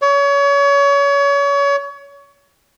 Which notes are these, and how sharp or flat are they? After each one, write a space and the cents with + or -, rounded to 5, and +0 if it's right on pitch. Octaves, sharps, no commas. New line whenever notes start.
C#5 +30